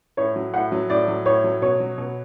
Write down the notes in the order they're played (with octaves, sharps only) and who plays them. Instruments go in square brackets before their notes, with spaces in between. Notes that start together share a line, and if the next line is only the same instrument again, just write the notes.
[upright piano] A2 C#5
F#3
A2 F#5
F#3
A2 D5
F#3
A2 C#5
F#3
B2 C#5
F#3
B2